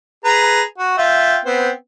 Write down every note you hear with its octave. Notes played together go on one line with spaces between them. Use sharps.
G#4 B4 A#5
F#4
F4 E5 G5
B3 C4 C5